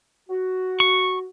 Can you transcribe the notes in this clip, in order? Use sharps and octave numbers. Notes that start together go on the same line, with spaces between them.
F#4
C#6